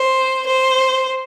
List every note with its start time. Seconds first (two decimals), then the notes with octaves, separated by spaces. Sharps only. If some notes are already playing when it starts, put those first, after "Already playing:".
Already playing: C5
0.47 C5